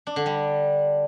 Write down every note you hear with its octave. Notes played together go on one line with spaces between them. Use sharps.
D4
D3
G3